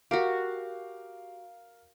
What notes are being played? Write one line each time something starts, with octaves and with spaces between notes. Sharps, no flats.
F#4 G4 A#4 F5